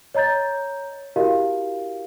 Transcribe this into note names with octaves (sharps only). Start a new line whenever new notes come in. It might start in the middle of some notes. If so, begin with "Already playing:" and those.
C#5 D#5 A#5 G6 A6
E4 F#4 G4 A#4 D#5 F5